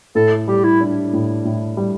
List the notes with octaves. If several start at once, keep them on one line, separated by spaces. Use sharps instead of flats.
A2 A4
G3 G4
E4
D4
A2
A2
G3